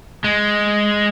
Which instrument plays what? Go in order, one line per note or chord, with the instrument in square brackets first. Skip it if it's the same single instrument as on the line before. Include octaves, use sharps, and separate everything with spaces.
[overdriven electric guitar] G#3